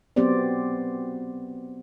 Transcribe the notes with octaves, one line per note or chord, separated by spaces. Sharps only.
F#3 B3 C4 G4 C5 D5